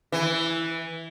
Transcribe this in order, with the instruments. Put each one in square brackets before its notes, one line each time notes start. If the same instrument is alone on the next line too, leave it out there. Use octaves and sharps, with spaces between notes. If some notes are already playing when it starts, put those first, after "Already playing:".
[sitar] E3